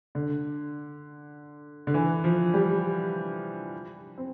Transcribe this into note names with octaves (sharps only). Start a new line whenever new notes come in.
D3
D3
E3
F3
G3
C4